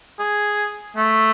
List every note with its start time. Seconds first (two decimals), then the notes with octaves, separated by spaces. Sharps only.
0.19 G#4
0.96 A3